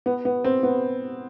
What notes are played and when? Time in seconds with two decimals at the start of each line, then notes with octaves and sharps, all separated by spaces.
0.06 B3
0.25 B3
0.45 C4
0.63 B3